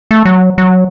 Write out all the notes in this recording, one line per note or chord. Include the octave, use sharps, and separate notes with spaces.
A3
F#3
F#3